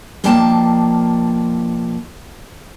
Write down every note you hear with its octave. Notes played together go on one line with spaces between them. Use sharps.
B2 F3 A#3 D4 G5 A5